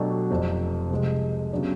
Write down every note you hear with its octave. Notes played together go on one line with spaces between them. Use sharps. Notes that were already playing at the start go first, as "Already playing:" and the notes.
Already playing: B2 F#3 A3 D4 G4
F1 F2 C3
C2 C3 F3 G#3
C#3 F#3 B3 D4 G4